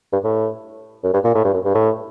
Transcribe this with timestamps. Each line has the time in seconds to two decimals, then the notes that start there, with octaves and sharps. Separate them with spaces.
0.13 G2
0.24 A2
1.04 F#2
1.14 G2
1.25 A#2
1.35 A2
1.44 G2
1.54 F#2
1.65 G2
1.74 A2